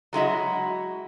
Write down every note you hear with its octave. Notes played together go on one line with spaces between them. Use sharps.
F#3 G#3 E4 F#4